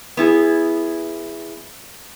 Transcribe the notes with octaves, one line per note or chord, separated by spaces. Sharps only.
B3 E4 G#4